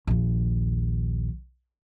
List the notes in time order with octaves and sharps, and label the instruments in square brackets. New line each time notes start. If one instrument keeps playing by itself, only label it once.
[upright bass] A#1 D#2